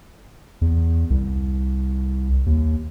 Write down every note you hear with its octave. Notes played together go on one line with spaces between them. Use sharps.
E2
C2
D#2